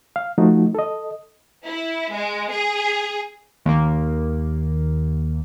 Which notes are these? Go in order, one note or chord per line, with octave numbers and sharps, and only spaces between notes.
F5
F3 A3 D#4 F4 F#4
A4 D#5
E4
G#3
G#4
D#2 A#3